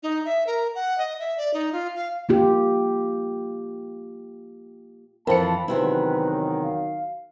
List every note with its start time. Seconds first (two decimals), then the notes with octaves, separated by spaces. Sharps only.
0.03 D#4
0.25 E5
0.47 A#4
0.75 F#5
0.98 D#5
1.19 E5
1.38 D5
1.54 D#4
1.72 F4
1.96 F5
2.29 A#3 F4 G4
5.27 F2 E3 A#4 C5 A5 B5 C#7
5.68 E2 C3 D#3 F#3 E4 B4
6.63 F5